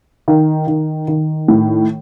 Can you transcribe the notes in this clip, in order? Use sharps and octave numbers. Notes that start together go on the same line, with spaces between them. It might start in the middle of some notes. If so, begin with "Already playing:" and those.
D#3
D#3
D#3
A2